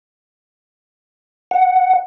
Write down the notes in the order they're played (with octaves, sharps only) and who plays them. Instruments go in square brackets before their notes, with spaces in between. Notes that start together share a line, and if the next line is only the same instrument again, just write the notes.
[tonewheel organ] F#5